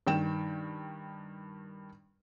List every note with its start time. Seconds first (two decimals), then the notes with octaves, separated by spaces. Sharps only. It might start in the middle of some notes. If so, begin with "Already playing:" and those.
0.07 G2 D#3 G5 E7